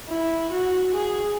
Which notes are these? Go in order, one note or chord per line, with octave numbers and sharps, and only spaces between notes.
E4
F#4
G#4